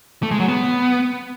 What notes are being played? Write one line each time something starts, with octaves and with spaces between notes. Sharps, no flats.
A3
G#3
F#3
B3